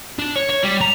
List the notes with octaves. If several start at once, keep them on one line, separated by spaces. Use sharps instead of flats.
D4
C#5
C#5
G3
A#5